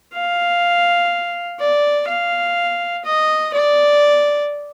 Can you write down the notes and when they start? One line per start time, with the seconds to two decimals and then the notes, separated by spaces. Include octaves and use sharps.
0.13 F5
1.59 D5
2.08 F5
3.05 D#5
3.53 D5